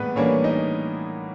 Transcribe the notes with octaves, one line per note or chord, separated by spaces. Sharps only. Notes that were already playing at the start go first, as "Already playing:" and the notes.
Already playing: A2 E3 G3 G#3 A#3 B3 B4
A2 E3 G3 A#3 C#4 D4 C#5
D#4 D#5